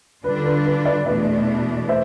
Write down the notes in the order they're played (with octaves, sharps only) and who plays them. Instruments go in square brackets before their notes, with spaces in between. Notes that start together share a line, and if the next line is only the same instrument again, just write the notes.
[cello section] D3 G3 D4 F4 [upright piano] B4
[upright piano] B4
B4
B4 D5
[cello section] E2 B2 A3 D4 [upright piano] B4 D5
[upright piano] C5 E5